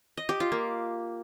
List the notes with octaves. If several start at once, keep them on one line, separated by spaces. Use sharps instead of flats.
D#5
G4
F4
A#3